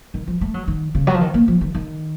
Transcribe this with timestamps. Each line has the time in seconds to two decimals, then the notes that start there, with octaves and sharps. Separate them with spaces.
0.14 D#3
0.27 F3
0.41 A3
0.54 F#3
0.68 D#3
0.95 C#3
1.07 F#3
1.14 F3
1.21 D#3
1.34 A#3
1.48 F3
1.61 D#3
1.74 D#3